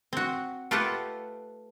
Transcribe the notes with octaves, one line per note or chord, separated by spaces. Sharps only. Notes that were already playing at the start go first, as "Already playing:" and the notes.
C4 F#4
A3 F4 G4 A4 B4 F#5